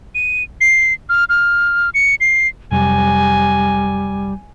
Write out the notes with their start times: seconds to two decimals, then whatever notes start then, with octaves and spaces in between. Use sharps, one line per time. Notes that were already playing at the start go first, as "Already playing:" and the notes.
0.15 D#7
0.61 C7
1.09 F6
1.29 F6
1.94 C#7
2.20 C7
2.72 F2 C3 F#3 G3 G#5